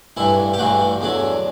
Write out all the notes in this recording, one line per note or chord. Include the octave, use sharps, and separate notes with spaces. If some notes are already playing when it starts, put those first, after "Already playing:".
A1 G2 E3 E4
G4
A1 G2 E3 F#4
E2 D3 F#3